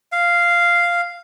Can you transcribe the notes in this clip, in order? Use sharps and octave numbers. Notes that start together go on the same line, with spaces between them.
F5